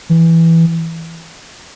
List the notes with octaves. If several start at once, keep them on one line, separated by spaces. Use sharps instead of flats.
E3